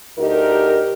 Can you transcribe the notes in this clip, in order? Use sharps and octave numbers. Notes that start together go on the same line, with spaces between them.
D2 D#4 G4 A#4